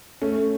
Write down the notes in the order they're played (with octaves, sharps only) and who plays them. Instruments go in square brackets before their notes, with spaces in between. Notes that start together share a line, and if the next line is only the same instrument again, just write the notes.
[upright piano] A3 C#4